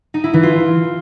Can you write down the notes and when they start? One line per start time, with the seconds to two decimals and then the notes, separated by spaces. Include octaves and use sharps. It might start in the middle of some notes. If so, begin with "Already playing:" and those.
0.14 D#4
0.24 E4
0.33 E3
0.43 F4